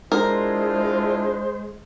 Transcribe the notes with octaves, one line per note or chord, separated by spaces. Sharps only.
G#3 D4 E4 F4 A#4 C5